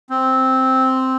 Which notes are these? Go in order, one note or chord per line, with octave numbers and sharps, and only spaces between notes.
C4